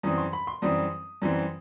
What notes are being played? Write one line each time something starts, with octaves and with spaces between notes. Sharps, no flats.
F#2 E3 G3 C4 D#6
C6
B5
C6
F#2 E3 G3 C4 D#6
F#2 E3 G3 C4